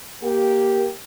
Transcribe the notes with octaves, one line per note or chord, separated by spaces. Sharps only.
A#3 G4